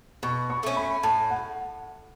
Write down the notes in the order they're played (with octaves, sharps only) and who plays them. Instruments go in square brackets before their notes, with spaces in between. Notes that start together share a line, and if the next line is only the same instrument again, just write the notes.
[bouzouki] B2 [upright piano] C#6
[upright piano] C#6
[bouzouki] A3 C#4
[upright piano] B5
[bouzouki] A2 [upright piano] A5
[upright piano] F#5